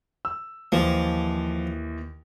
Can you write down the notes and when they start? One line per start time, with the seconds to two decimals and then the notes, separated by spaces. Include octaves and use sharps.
0.25 E6
0.72 D#2 E3 F3